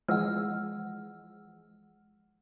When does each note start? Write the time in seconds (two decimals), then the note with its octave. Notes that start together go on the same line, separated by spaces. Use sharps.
0.08 E3 F3 G#3 F#5 E6 F6